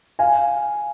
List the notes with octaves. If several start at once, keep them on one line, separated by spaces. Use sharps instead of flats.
F5 G#5